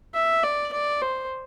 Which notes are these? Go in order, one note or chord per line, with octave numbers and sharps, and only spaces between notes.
E5
D5
D5
C5